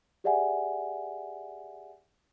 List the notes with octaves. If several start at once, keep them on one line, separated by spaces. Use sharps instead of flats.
G4 G#4 D5 E5 F#5 G#5